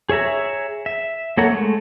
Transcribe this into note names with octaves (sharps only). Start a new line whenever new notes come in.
G#4 C#5 E5 A#5
E5
A#3 A4 C#5 F#5 A#5
G#3 A3